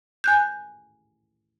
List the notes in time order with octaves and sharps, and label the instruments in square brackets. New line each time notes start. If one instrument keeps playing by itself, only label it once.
[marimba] G#5 F#6 G6